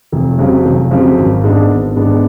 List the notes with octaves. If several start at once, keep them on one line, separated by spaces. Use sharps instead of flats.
F1
F2 C#3 F#3
F1
F2 C#3 F#3
G#1
G#2 G#3 B3 D4
G#1
G#2 G#3 B3 D4